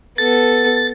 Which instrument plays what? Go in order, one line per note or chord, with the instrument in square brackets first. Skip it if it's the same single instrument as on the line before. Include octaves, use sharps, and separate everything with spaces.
[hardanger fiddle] B3 A4 [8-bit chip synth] A6